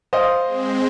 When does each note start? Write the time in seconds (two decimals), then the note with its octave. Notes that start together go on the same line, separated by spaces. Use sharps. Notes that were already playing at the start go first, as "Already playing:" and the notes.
0.13 C5 D#5 F5
0.43 G#3 C4